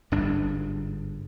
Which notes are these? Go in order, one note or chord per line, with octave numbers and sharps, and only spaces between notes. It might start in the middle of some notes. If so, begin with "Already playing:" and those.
G1 G#2 G3 D4